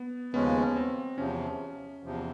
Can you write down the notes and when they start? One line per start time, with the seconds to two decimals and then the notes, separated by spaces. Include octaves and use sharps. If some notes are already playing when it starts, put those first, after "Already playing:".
Already playing: B3
0.33 D#2 C#3 F3 G#3 B3 C#4
0.76 C4
1.18 E2 C3 F3 C#4
2.03 E2 C3 F3